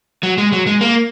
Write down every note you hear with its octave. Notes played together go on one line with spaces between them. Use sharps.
F#3
G#3
F#3
G#3
A#3